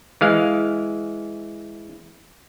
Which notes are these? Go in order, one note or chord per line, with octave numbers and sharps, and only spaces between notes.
E3 G#3 F5